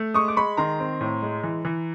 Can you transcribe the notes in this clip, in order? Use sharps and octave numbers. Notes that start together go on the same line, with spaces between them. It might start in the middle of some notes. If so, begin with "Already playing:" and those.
Already playing: A3
G#3 C#6 D#6
D6
G#3 B5 C#6
D#3 A#5 C6
C4
A2
G#3
E3
E3